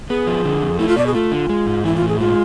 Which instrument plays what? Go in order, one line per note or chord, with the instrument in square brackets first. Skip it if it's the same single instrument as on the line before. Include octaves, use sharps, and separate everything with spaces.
[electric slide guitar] B3 [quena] G#4
[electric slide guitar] F3
D3
F2
[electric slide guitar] A3 [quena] E4
[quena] F4
[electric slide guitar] B2 [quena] D5
[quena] G#4
[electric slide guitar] A3 [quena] F4
[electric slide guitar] D3
G#3
G#2
[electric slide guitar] E3 [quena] E4
[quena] F4
[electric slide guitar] A2
[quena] G#4
[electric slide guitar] G#3 [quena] F4